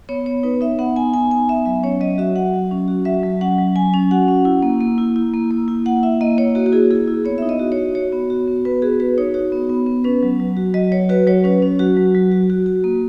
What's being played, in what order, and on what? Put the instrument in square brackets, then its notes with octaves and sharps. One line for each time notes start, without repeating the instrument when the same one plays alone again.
[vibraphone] B3 C#5
B3 C#5
D#4 B4
D#4 E5
B3 F#5
B3 G#5
D#4 G#5
B3 G#5
B3 E5
F#3 E5
C#4 C#5
F#3 D#5
F#4 E5
F#3 F#5
F#3
C#4
F#4
F#3 E5
F#3
C#4 F#5
F#3
F#3 G#5
C#4
F#4 F#5
C#4
E4
A#3
A#3
E4
E4
A#3
A#3
E4
A#3 F#5
E4 E5
A#3 D#5
A#3 C#5
A#3 F#4
F#4
E4 G#4
E4 G#4
E4
B3 C#5
D#4 E5
D#5
F#4
C#5
F#4
F#4 C#5
B3
F#4
B3
B3 B4
F#4 G#4
F#4 B4
D#4 C#5
F#4 C#5
B3
B3
B3
C#4 B4
F#3
F#3
F#4
F#3 D#5
F#3 C#5
F#4 B4
F#3 C#5
C#4 B4
C#4
F#3 F#4
F#3
F#3
F#4
F#4
F#4
A#3